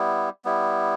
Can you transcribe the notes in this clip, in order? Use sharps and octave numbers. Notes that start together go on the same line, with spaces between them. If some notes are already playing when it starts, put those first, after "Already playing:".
Already playing: G3 B3 E4
G3 B3 E4